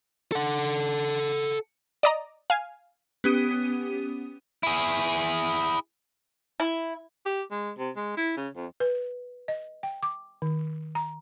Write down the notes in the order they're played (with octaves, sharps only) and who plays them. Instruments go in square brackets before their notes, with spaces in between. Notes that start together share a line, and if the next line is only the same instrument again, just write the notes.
[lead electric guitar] A4 F#5
[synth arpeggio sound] D5 D#5 A#5
F5 G#5
[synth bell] B3 C#4 G4 D#6 D#7
[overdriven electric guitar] E4 G#4
[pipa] E4
[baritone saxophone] G4
G#3
C3
G#3
E4
C#3
F2
[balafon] B4
D#5
G5
D6
D#3
A#5